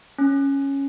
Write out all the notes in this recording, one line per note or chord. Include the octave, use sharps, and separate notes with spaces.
C#4